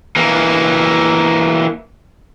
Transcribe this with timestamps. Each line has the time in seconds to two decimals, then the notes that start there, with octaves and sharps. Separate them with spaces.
0.16 E3 A#3